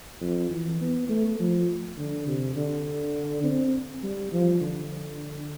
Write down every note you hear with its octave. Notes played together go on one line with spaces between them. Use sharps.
F2
E3
B3
A3
F3
D3
C3
D3
C4
G3
F3
D3